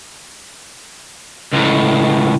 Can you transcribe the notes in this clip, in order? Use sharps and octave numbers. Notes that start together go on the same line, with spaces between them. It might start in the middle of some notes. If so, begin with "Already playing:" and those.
C#2 A2